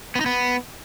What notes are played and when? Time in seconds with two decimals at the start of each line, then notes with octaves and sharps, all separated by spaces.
0.15 B3
0.21 D#4
0.26 B3